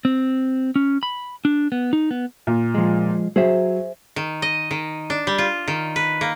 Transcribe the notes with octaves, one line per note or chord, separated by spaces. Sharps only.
C4
C#4
B5
D4
B3
D#4
B3
A#2
F3 G#3
F#3 G#4 C5 E5
D#3
D#5
D#3
D4
G3
F4
D#3
B4
A#3